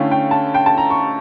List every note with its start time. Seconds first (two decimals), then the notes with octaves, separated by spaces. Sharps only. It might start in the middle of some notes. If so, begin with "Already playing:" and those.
Already playing: D3 A3 C#4 E4 F5 G5
0.11 G5
0.31 A5
0.54 G5
0.66 A5
0.78 A#5
0.90 C#6